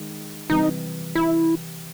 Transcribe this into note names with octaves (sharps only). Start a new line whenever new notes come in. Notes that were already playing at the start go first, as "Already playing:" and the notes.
Already playing: D#3 G#3
C3 E3 G3 D#4
E4